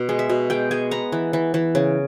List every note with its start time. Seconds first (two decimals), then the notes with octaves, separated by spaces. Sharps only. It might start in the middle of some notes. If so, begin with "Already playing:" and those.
Already playing: B2
0.09 G#3
0.19 E5
0.29 B2
0.50 G#3 G5
0.71 G#3 G#5
0.91 B3 A#5
1.12 E3
1.33 E3
1.54 E3
1.75 C#3